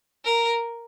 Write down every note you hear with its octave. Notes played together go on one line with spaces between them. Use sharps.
A#4